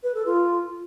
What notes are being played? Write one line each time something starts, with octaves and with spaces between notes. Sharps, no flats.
B4
A4
F4